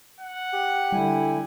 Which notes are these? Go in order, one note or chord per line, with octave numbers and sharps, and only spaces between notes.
F#5
G4
D3 G3 E4 G#5